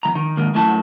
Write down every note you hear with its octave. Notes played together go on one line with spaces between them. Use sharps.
E2 E3 A#5
D#3
G#2 D#3 A#3
F#2 A3 E4 A5